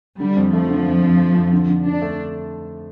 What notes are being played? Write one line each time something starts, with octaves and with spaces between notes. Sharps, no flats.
D3 G3
F2
F3 A3
D3
F2
F2
F2
F2
D3
D3
D3 D4
A3